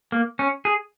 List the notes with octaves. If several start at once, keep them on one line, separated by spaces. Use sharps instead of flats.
A#3
C#4
G#4